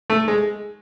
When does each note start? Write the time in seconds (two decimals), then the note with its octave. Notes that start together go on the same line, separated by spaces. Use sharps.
0.10 A3
0.28 G#3